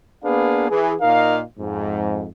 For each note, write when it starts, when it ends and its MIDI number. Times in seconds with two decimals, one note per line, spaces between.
0.24 0.69 58
0.24 0.69 59
0.24 0.69 62
0.24 0.69 68
0.24 0.69 71
0.24 0.69 77
0.70 0.94 52
0.70 0.94 68
1.01 1.39 46
1.01 1.39 63
1.01 1.39 70
1.01 1.39 75
1.01 1.39 77
1.58 2.27 41
1.58 2.27 44